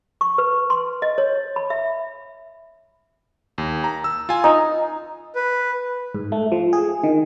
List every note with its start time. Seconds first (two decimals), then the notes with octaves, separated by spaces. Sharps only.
0.21 C#6
0.38 B4
0.70 C6
1.02 D#5
1.18 C#5
1.56 B5
1.70 E5
3.58 D#2
3.84 A#5
4.04 E6
4.29 F4 G#5
4.44 D#4 A#5
5.35 B4
6.15 G#2
6.32 A3
6.52 F3
6.73 G#4
7.03 D#3